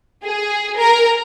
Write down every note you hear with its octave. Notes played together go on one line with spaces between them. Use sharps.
G#4
A#4